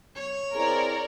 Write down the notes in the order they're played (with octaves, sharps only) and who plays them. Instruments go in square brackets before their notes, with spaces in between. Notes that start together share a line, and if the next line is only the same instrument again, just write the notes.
[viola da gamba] C#5
[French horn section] C4 E4 G#4 [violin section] A#4 D5